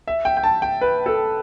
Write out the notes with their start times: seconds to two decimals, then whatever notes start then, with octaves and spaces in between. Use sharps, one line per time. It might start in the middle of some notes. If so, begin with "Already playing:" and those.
0.07 E5
0.25 G5
0.37 G5
0.43 A5
0.62 G5
0.81 B4
1.06 A4